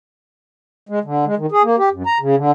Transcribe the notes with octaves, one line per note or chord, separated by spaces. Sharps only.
G#3
D3
G#3
D#3
G#4
A#3
G4
F#2
A#5
C#3
D3